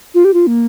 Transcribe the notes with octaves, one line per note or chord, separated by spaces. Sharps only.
F4
G4
F4
A#3